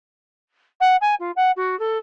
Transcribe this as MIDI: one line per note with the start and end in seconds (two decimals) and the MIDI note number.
0.81 0.96 78
1.01 1.15 80
1.20 1.31 65
1.36 1.51 78
1.56 1.78 66
1.79 1.98 69